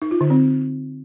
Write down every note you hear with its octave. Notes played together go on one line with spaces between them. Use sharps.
D#4
F4
D3
C4